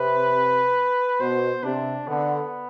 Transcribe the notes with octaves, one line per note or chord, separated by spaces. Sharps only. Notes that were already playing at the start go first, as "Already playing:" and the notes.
Already playing: C3 B4
B2 C5
C3 D4
D3 B3